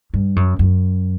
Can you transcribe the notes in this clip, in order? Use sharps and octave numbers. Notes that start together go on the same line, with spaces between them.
G2
F#2
F#2